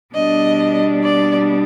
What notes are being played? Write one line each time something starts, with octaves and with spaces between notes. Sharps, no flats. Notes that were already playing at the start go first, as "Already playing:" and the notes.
B2 G3 B3 D4 D#5
D5